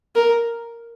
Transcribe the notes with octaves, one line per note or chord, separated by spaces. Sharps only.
A#4